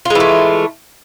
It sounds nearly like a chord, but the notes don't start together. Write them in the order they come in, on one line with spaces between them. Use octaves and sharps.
F4 G#3 E3 A3